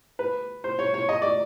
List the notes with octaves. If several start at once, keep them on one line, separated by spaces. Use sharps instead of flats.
B4
C5
C#5
C#5
D#5
D5